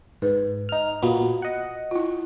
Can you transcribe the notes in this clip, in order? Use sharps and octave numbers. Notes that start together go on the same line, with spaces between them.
G#2 B4
D#4 F6
A#2 A#3 B3 F4 F#4
D#5 F#5
E4 F4